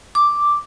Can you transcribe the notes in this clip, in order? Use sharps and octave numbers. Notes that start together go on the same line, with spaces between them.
D6